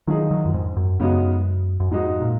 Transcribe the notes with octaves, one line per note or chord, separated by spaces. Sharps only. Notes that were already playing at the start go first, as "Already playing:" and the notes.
D#3 F3 F#3 G#3 D#4 G#4
D#3 F#3
F#2
F2 G#2
F#2
F#2 C#3 G#3 B3 D#4 F#4
F#2
F2 G#2 F3 G#3 D#4 F#4
A#2